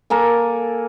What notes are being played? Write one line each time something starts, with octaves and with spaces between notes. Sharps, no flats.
A#3 A4 G#5